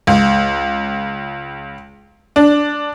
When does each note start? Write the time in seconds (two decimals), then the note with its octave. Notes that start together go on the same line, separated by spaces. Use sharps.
0.07 C#2
2.36 D4